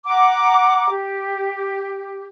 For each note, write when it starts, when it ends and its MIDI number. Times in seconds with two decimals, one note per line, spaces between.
0.06 0.90 78
0.06 0.90 82
0.06 0.90 86
0.90 2.25 67